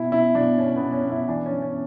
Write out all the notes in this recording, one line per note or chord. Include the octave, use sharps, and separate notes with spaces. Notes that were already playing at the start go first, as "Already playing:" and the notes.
Already playing: B2 E4
B2 E4
B2 D4
B2 C#4
B3
B2
C#4
B2
E4
E3 D4
C#4
E3
C#4